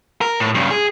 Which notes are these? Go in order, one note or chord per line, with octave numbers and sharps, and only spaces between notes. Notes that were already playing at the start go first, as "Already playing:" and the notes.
A#4
A2
G2 C#3
G#4